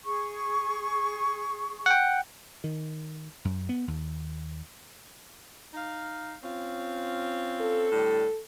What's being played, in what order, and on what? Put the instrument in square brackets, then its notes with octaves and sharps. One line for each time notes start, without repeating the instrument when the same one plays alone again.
[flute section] G#4 C#6
[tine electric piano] F#5 G5
[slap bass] D#3
F#2
B3
D#2
[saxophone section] D#4 F5
C4 C#4 F4
[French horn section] A4
[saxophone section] A2 D3 G3